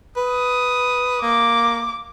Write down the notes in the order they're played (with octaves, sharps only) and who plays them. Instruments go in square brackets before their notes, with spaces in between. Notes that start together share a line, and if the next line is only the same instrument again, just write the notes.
[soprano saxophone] B4 [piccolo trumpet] D#6
[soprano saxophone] A#3 [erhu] D6